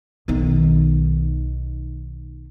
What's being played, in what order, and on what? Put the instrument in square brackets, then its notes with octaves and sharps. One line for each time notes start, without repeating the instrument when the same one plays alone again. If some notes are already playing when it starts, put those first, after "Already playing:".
[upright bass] B1 D#3